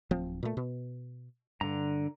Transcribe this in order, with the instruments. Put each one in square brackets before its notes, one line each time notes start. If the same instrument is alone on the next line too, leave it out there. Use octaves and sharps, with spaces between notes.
[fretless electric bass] D1 F3 C4
A#2 A3
B2
[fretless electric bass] G2 [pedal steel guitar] D3 A#5